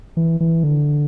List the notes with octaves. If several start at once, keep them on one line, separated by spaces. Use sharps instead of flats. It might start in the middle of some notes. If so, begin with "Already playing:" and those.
E3
E3
D3